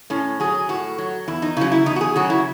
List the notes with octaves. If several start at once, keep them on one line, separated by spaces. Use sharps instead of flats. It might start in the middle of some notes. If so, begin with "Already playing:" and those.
A2 C#4
F#3 G#4
A2 F#4
F#3
E2 E4
D#4
C#3 F#3 E4
E4
E2 D#4
F#4
G#4
C#3 F#3 F#4
E4